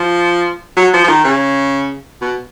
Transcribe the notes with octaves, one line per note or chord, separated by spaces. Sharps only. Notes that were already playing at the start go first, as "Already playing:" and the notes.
Already playing: F3
F#3
F3
F3
D#3
C#3
B2